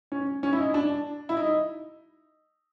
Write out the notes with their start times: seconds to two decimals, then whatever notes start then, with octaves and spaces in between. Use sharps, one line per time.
0.12 C#4
0.43 C#4
0.53 E4
0.59 D#4
0.74 D4
1.29 E4
1.37 D#4